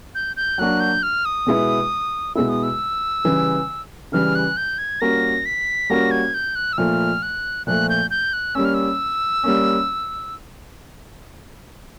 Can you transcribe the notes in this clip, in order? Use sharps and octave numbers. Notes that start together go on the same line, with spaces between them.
G6
G6
F#3 A#3 D4 F#4 F#6
G6
F6
D#6
B2 G#3 B3 E4
B2 G#3 B3 E4 E6
D#6
E6
C#3 E3 G3
C#3 E3 G3 F6
F#6
G6
G#6
G3 A#3 C#4 F#4 A#4 A#6
B6
G3 A#3 C#4 F#4 A#4 A#6
G#6
G6
F#6
E6
A#2 F3 A3 F6
F#6
A#2 F3 A3 F#6
G6
G6
F#6
G3 A#3 C#4 E6
F6
E6
G3 A#3 C#4